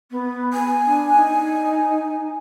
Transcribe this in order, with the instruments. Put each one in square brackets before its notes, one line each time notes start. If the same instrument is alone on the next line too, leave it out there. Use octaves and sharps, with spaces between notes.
[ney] B3
[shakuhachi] G#5
[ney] D4
D#4